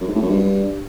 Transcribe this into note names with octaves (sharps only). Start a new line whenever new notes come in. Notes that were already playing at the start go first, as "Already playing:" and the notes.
F#2
G#2
A2
F#2
G2